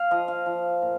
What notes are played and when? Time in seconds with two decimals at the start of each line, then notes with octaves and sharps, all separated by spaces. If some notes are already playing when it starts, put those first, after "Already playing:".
Already playing: F5
0.11 F3 D#5
0.28 F5
0.46 F3
0.82 A#2